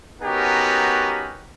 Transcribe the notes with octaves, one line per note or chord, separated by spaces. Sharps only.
B3 C#4 D#4 F#4 G4 A#4